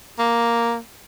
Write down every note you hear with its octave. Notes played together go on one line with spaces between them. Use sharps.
A#3